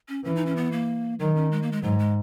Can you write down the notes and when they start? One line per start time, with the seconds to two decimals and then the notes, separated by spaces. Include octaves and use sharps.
0.09 C#4
0.24 E3 C#4
0.35 D#4
0.46 C#4
0.57 B3
0.72 A#3
1.20 D#3 F#3
1.36 C#4
1.51 G#3
1.62 A#3
1.72 G#3
1.83 G#2 F#3
1.99 G#3